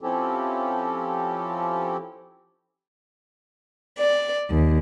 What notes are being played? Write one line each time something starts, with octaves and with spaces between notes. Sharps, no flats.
F3 C4 C#4 E4 G4 A4
D5
D#2